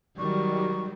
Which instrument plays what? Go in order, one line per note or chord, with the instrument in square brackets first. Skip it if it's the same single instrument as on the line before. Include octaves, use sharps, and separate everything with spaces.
[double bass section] D#3 G3 [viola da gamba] F#3 [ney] C#6